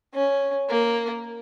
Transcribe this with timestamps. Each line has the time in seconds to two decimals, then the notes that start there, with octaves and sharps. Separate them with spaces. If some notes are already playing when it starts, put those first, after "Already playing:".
0.14 C#4
0.70 A#3